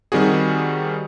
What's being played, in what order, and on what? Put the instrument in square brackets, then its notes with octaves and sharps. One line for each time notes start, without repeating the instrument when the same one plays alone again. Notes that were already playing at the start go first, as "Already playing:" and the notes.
[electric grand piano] D#3 G3 C4 F#4 G#4